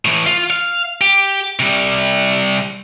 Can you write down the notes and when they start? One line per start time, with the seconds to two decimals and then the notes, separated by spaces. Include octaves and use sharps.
0.05 A2 E3
0.26 F4
0.50 F5
1.01 G4
1.60 C3 G3